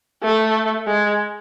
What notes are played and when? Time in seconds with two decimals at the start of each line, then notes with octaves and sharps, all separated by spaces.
0.23 A3
0.87 G#3